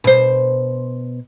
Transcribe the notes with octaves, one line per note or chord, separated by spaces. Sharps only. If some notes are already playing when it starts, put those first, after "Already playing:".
B2 C5